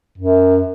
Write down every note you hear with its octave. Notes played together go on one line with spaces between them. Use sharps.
F#2